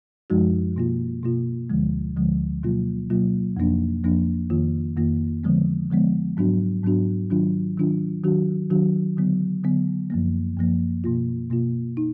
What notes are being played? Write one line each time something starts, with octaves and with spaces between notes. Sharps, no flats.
F#2 F3 G#3 D#4 F#4
B2 A#3 F4
B2 A#3 F4
D2 D3 F3 G#3
D2 D3 F3 G#3
B2 F#3 A#3 F4
B2 F#3 A#3 F4
F2 F3 A#3 D4
F2 F3 A#3 D4
F2 D#3 A#3 F4
F2 D#3 A#3 F4
D3 F3 G#3 B3
D3 F3 G#3 B3
G#2 F#3 B3 D4 F#4
G#2 F#3 B3 D4 F#4
D#3 F#3 D4 F4
D#3 F#3 D4 F4
D#3 F#3 D4 F#4
D#3 F#3 D4 F#4
D3 F#3 B3
D3 F#3 B3
F#2 F3 A#3
F#2 F3 A#3
B2 A#3 F4
B2 A#3 F4
D#4